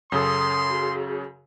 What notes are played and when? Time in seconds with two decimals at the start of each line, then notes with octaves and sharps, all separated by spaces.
0.12 F#2 C#3 A4 C6 D#6
0.70 F#4 G#4